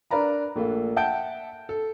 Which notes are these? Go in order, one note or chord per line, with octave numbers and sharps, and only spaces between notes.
D4 A#4 B4 D5 A#5 B5
A#1 A3 A#3
E5 F#5 G5 A5 G6 D7
A4